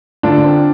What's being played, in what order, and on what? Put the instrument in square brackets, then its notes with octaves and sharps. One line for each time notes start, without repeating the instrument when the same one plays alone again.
[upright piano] D3 [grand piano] D4 F4
[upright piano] C4